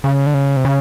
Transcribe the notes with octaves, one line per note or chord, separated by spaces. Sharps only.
C#3
D3
C#3
C3
C#3